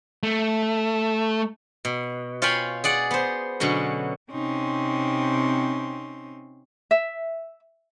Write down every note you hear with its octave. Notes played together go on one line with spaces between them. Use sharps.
A3
B2
F4 C#5 F5 G5 G#5 B5
G#4 D5 F#5
B3 C5
B2 D3 F#3 C#4
C3 C4 C#4 D#4 C6
E5